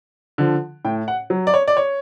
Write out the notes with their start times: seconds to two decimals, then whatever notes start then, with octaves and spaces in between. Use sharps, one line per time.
0.38 D3 F3
0.85 A2 G5
1.08 F#5
1.30 F#3
1.47 D5
1.54 C#5
1.68 D5
1.77 C#5